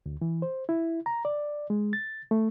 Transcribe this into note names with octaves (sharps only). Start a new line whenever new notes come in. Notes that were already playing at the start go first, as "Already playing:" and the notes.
D2
E3
C5
E4
A#5
D5
G#3
A6
A3